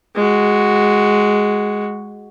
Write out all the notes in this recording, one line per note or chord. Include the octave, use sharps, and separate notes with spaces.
G#3 F#4